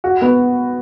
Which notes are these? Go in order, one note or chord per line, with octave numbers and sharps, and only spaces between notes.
F#4
B3